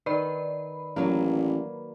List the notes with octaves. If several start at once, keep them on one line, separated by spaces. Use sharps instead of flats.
D#3 B4 D5 B5
A1 F#3 A#3